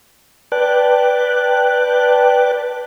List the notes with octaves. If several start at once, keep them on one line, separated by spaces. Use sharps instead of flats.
B4 D5 G5 A5 F#6